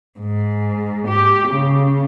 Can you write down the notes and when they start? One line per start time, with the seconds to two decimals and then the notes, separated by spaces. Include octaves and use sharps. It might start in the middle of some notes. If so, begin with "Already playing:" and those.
0.19 G#2
1.07 G4
1.48 C#3